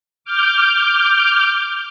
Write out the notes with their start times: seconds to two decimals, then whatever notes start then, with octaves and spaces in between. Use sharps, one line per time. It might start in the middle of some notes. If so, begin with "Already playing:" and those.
0.24 D6 F6 G6